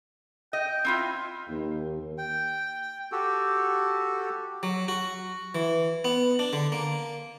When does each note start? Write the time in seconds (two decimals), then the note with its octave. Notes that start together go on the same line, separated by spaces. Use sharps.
0.53 D#5 G5
0.85 C4 E4 F4
1.48 D#2
2.18 G5
3.12 F#4 G4 A4
4.63 F#3
4.88 F#4
5.55 E3
6.05 B3
6.39 D4
6.53 D3
6.72 A#3